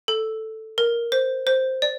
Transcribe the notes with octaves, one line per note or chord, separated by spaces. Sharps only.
A4
A#4
C5
C5
D5